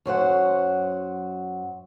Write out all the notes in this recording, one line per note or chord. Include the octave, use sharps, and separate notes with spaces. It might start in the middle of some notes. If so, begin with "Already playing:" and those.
F#2 F#3 C5 F#5